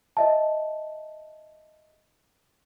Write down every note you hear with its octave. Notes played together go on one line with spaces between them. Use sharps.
D#5 E5 A5